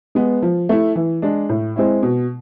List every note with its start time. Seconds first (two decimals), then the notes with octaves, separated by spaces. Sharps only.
0.15 G#3 B3
0.42 F3
0.69 A3 E4
0.95 E3
1.22 G#3 D4
1.49 A2
1.76 G#3 C4 E4
2.03 B2